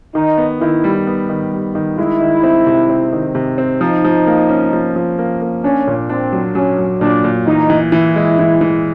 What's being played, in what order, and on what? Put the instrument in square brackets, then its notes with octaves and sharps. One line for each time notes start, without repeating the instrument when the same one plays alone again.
[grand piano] D#3 [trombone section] D#4
[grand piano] B3
[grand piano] D#3 [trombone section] E4
[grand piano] G3
B3
D#3
G3
D#3
[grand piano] G#3 [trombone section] E4
[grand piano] D#3
C4
C3
C4
D#3
C3
C4
[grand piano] F3 [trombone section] D#4
[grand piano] F3
A#3
C#4
F3
F3
A#3
A#3
[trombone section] C#4 [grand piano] D4
[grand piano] A#2
[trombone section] C4 [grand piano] D4
[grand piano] F#3
[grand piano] F#3 [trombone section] C#4
[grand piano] F#3
[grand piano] A#2 [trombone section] D4
[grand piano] A#2
[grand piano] E3 [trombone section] D#4
[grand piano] E3
[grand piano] E3 [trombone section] E4
[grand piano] G#3
E3
E3